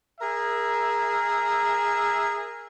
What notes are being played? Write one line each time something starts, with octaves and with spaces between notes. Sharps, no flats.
G#4 A#4 E5